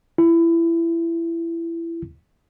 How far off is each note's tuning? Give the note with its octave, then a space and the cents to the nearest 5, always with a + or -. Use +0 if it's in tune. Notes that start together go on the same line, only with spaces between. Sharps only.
E4 +20